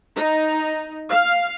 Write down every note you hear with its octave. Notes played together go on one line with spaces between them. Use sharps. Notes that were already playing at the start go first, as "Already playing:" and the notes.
D#4
F5